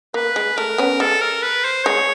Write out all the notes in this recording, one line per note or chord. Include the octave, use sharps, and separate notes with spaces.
A#3 B4
G#3
A3 A#4
B3 C#4
G#3 A4
A#4
B4
C5
G#3 C#5